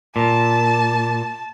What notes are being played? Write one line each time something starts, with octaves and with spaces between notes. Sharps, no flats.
A#2 A5